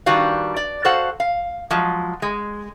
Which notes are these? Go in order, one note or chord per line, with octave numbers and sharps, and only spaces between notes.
D#3 G3 D4 F#4 B4 F5
D5
F#4 A4 C5 F5 F#5
F5
F3 F#3 G#3
G#3